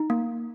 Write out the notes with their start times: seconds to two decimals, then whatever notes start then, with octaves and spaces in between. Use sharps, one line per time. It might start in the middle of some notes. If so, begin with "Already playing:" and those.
Already playing: D#4
0.10 A#3